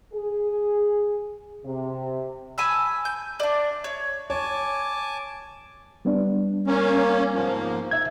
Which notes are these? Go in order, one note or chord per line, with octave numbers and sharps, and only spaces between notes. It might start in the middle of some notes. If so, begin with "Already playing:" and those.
G#4
C3
G#5 A5 B5 E6
G6
D4 D5
C#5
C#5 G#5 A5 D6
G3 B3 D4
A#3 C#4
G#2 F3 A#3
E5 G#6